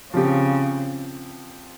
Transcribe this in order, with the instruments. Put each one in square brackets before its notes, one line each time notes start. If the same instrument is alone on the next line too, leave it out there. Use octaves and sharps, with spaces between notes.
[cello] C#3 [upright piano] F3 C4 G4